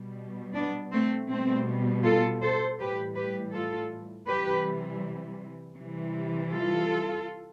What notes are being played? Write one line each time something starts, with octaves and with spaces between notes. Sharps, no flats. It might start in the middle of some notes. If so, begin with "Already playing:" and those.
Already playing: B2 G3
B3 D4
A3 C4
B2 G3 A3 C4
F4 A4
A4 C5
A2 E3 G3 G4 B4
G4 B4
F4 A4
C3 E3 G3 G4 B4
C3 E3 G3
F4 A4